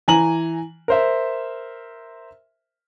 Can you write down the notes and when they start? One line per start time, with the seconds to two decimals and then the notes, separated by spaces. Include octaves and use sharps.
0.08 E3 G#5 A#5 F#7
0.88 A#4 C5 E5